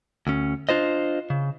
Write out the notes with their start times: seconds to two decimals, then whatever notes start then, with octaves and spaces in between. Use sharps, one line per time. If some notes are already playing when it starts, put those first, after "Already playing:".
0.27 D2 C#4
0.69 D4 F4 C5 D#5
1.30 C#3